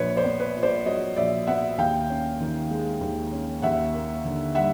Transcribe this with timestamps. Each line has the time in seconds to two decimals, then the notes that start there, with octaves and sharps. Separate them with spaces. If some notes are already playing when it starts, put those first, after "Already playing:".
Already playing: A#1 B4 C#5
0.16 C5 D5
0.24 B3
0.40 B4 C#5
0.56 A#2
0.63 C5 D5
0.85 F#3 C#5 D#5
1.17 A#1 D5 E5
1.47 B3 E5 F#5
1.78 D#2 F5 G5
2.10 C#4
2.40 D#3
2.70 G#3
3.01 D#2
3.32 C#4
3.62 D#2 E5 F#5
3.94 A#3
4.25 D3
4.55 G3 E5 F#5